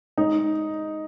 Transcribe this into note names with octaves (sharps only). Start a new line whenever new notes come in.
G#3 D#4